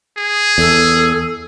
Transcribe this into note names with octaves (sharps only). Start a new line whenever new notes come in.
G#4
E2 A4